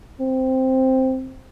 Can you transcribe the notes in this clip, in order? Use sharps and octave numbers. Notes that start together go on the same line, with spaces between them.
C4